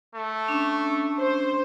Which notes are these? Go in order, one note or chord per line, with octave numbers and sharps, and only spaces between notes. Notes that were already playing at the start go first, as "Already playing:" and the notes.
A3
C#4 D4
C5